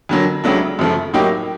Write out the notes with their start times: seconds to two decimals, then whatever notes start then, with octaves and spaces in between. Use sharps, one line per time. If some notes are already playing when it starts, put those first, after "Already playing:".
0.09 F2 D3 F#3 A#3
0.44 C#2 C#3 F#3 A3 D4
0.79 F#2 C#3 F3 A3
1.13 A2 F#3 A#3 D#4 G4